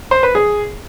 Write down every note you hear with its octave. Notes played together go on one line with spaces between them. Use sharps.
C5
B4
G#4